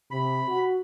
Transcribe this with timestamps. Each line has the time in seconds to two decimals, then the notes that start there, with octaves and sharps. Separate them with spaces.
0.11 C3 B5
0.48 F#4